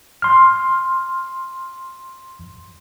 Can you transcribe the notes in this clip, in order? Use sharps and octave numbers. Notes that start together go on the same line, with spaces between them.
C6 F6